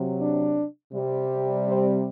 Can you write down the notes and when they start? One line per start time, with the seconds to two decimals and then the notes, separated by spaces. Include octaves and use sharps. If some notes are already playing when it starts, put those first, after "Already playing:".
Already playing: C3 F#3
0.21 D4
0.93 C3 G3
1.67 C4